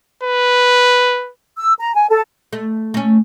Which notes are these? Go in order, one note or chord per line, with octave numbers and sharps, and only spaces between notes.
B4
E6
A#5
G#5
A4
A3
A3 C#4